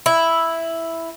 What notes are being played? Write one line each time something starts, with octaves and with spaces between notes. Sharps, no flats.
E4